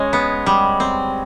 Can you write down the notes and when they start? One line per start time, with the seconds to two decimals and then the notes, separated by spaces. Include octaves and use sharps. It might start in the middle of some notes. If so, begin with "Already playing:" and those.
Already playing: G#3 C#4 C#5 D#5
0.13 B3
0.46 G3
0.80 C4